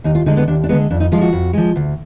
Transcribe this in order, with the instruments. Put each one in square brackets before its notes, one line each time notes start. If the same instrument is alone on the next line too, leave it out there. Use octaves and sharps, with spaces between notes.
[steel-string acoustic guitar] D#2 D#4
F4
D3 G#3 D#4
B3
D#2 D4
D4
G#3 B3
D3
F2 D4
D#4
F3 G#3 F4
F#4
F2
F3 G#3
D2